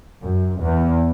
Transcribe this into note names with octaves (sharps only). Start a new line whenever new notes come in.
F#2
E2